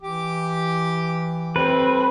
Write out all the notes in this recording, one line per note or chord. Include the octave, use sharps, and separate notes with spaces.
E3 G4 D6
G3 A3 C4 B4